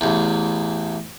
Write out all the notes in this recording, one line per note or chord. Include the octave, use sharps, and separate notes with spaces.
A1 E2